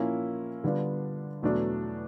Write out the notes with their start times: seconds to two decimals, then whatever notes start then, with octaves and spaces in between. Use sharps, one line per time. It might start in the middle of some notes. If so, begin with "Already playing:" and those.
Already playing: A#2 F3 A#3 C#4 E4
0.64 D3 G3 B3 D4 F4
1.42 E2 B2 F#3 A3 D4